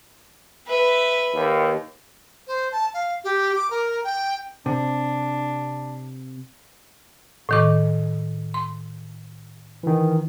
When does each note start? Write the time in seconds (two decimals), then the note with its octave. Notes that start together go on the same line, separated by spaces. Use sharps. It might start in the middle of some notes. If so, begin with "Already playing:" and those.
0.66 B4 E5
1.34 D#2
2.47 C5
2.72 A5
2.94 F5
3.24 G4
3.55 D6
3.70 A#4
4.04 G5
4.66 C3 D4
7.49 A2 D#3 D6
8.54 C6
9.83 D#3 E3